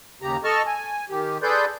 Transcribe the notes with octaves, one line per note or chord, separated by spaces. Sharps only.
D#2 C#3 G4 A#5
A4 D#5 A5 C#6 F6
G#5
D#3 G4
G#4 A4 B4 D5 C6 G6